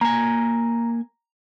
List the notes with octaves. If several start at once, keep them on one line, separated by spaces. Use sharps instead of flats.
A#3 G#5 A#5